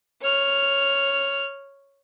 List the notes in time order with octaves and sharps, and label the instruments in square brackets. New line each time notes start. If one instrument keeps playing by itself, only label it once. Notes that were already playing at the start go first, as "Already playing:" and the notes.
[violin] C#5 F6